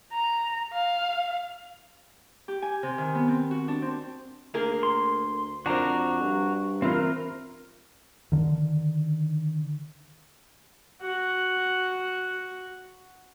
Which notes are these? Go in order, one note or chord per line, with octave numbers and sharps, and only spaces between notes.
A#5
F5
G4
G#5
C3
D#3
B3
C4
F#4
D4
C4
D2 A#3 G#4 A#4
C6
F2 D4 F#4 A#4 C5 A#5
G2
E3 C4 F4 A#4
D3 D#3
F#4 F#5